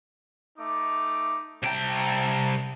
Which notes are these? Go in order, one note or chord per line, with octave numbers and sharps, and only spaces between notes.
A3 D#4 D6
C2 E4 G5 A5 A#5